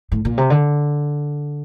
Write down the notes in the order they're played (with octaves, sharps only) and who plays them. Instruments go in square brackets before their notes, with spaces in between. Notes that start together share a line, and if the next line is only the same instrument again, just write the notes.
[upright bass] A2
A#2
C3
D3